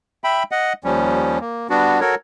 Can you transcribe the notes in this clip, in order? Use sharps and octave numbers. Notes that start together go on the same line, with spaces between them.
E5 G5 B5
D#5 F#5
D#2 F3 G3 C#4
A#3
G3 B3 D4 F#4
F#4 A4 A#4 C#5